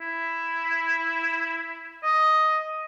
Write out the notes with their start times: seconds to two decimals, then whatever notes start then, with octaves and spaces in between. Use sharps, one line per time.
0.01 E4
2.03 D#5